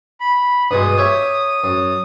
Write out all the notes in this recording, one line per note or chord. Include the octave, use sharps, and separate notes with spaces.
B5
G2 B2 G#3 D#6
G4 C#5 E5
F#2